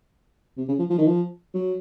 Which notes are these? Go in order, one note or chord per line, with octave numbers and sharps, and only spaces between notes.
C3
C#3
F3
F3
D#3
F3
F#3